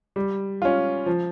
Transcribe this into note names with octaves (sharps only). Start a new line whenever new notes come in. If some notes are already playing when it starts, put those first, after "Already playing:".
G3
C#4 F4
F3